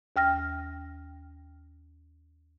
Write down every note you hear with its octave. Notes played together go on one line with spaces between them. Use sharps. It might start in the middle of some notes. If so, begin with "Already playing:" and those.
D#2 G5 F6 A#6